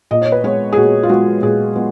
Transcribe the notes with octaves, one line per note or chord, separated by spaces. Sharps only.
A#2 D#5
C#5
B4
G#3 B3 C#5
G#4
A#2 F#4
F4
G#3 B3 F#4
A#2 G#4
G#3 B3